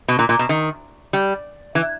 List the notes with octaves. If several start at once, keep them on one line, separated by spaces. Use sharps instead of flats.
B2
A#2
A#2
B2
D#3
G3
E3